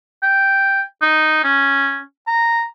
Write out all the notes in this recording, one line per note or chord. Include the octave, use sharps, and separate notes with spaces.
G5
D#4
C#4
A#5